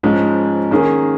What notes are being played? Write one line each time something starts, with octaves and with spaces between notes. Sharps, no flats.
G#2 F3 G#3 C#4
D#3 A#3 C#4 G#4